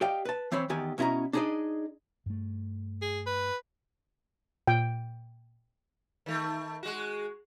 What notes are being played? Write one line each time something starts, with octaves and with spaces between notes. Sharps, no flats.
G4 D5 D#5 F5 G5
B4 A5
E3 C4 C5 C#5 B5
E2 D#3 G4 G#5
B2 C#4 E4 D#5 A#5
D4 D#4 G#4 C5 D5 D#5
G2 A3
G#4
B4
A#2 G5
D#3 A3
G#3 F#4